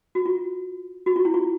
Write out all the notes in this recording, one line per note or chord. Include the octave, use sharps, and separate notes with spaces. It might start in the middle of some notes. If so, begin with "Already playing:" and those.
F#4
F4
F#4
F4
E4
F4